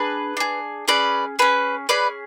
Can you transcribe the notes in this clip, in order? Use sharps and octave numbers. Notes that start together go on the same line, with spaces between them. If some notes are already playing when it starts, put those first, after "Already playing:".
Already playing: D4 G#4 B4
D4 G#4
C#4 G#4 B4 D5
C#4 G#4 B4
C#4 G#4 B4 D5